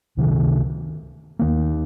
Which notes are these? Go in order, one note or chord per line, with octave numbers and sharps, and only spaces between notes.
C#2 C3 D#3
D#2 D#3 A#3